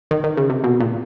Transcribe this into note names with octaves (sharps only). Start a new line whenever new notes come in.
D#3
D#3
C#3
C3
B2
A#2